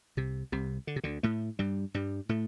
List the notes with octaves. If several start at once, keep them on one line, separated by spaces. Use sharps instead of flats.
C2 C3
C2 C3
D3
C3
D2 D3
A2 A3
G2 G3
G2 G3
A2 A3